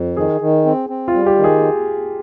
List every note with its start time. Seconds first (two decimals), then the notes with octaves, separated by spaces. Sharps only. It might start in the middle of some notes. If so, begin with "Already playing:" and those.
Already playing: F2
0.17 D#3 G#4
0.41 D#3
0.66 C4
0.90 C4
1.08 F4
1.14 G3
1.26 G4
1.38 D#3
1.44 G#4